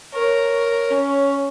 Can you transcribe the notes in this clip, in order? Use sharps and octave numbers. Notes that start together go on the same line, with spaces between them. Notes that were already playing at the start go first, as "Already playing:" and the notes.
A#4 C#5
C#4